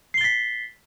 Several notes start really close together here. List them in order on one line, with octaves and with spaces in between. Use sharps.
C7 G7 A6 B6